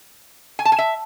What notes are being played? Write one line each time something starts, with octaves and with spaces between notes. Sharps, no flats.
G#5
A5
G#5
E5